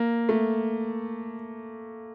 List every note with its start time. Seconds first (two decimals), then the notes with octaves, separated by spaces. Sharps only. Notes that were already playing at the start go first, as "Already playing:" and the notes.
Already playing: A#3
0.29 A3